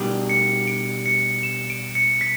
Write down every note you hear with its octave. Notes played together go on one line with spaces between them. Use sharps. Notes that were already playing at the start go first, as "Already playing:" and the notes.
Already playing: B2 G3 D4 G4
C#7
D7
C#7
E7
D7
C#7
B6